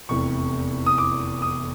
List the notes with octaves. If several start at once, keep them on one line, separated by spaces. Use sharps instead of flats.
F1 E2 C3 C#6
D#6
D6
D#6